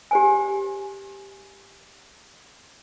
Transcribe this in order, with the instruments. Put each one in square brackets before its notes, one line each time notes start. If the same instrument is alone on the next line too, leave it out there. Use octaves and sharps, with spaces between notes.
[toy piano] G4 C5 G#5